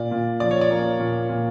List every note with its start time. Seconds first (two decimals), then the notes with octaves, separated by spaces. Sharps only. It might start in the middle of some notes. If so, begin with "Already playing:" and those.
Already playing: A#2 D5
0.11 A#2
0.40 F3 D5
0.51 C#5
0.61 D5
0.71 A#3
1.00 A#2
1.29 A#2